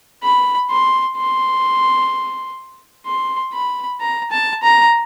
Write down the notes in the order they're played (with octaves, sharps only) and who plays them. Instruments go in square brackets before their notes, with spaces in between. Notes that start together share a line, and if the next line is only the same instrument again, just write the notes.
[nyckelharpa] B5
C6
C6
C6
B5
A#5
A5
A#5